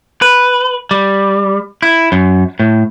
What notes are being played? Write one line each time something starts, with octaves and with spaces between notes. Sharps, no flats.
B4
G3
E4
F#2
A2